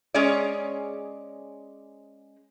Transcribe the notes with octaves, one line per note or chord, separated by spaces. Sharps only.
G#3 C#4 G#4 C#5 D5